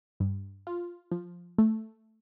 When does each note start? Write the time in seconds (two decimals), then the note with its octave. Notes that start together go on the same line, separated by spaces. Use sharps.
0.20 G2
0.67 F4
1.11 F3
1.58 A3